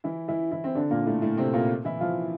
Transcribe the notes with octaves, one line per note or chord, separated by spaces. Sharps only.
E3 E4
E3 E4
E3 E4
C4
D3 D4
A#2 A#3
A2 A3
A2 A3
C3 C4
A#2 A#3
E3 E4
F3 F4